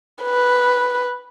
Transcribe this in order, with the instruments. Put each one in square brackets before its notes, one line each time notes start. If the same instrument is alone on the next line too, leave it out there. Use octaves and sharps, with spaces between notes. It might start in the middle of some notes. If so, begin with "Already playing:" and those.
[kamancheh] B4